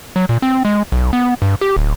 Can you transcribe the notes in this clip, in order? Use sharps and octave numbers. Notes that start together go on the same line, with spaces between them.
F#3
A#2
C4
G#3
B1
B3
G2
G4
D1